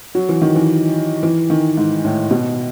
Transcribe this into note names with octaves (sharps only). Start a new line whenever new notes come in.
F#3
E3
D#3
E3
E3
D#3
G#2
A2
B2